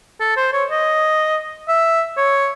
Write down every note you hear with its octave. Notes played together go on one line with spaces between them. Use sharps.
A4
C5
C#5
D#5
E5
C#5